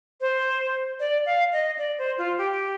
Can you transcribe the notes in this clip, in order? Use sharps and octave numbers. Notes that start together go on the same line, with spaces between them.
C5
D5
F5
D#5
D5
C5
F4
G4